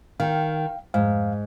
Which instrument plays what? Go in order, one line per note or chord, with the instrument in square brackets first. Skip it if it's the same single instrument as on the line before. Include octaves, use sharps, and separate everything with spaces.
[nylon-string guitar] D#3 [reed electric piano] F5 G5
[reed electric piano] F2 F5 [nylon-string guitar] G#2